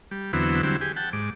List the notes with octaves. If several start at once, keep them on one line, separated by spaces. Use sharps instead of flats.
G3
E2 D3 F#3 B3 C4 E4
D3 F#3 G3 C4 E4
G4 G#4
F#5 G5 A5
G#2 D6